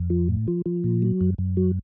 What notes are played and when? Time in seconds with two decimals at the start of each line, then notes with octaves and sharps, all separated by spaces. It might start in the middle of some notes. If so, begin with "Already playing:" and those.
Already playing: F2
0.10 F3
0.29 A2
0.48 F3
0.66 F3
0.84 A#2
1.02 F#3
1.21 F#2
1.38 F#2
1.57 F#3